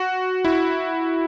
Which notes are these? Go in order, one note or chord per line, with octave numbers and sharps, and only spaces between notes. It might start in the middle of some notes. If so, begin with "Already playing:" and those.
Already playing: F#4
E4